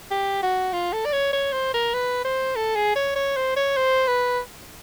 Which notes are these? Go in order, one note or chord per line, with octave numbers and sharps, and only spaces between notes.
G4
F#4
F4
A4
D5
C#5
C#5
C5
A#4
B4
C5
A4
G#4
C#5
C#5
C5
C#5
C5
B4